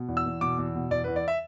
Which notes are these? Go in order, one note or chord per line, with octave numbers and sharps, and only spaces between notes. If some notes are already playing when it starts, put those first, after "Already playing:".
Already playing: B2
E2
E6
E2
B2 D6
E2
B2
E2 D5
E2 B4
D5
E5